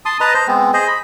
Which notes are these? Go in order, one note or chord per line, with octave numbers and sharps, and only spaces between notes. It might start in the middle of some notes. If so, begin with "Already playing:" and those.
A5 C6 D#6
B4 D#5 A5 A#5
C5
G#3 B3 C4
G#4 C5 D#5
B5